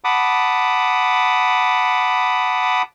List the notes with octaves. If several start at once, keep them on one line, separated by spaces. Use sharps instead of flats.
F#5 A5 B5 D6 D#6